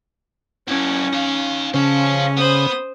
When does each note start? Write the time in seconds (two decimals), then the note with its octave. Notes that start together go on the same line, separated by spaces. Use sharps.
0.68 F#3 C#4 E4
1.13 D#4 F5
1.74 C#3 C#4 C5 F5
2.37 B3 C5 B5 D#6